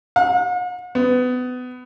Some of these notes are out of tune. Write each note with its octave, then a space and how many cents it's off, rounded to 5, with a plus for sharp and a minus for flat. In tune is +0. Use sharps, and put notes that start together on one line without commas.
F#5 -45
B3 +25